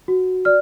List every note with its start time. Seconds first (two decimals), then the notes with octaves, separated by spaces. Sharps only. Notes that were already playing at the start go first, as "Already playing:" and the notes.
0.08 F#4
0.45 D5 F6